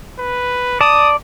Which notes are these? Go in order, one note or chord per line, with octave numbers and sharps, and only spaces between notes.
B4
D5 A5 D#6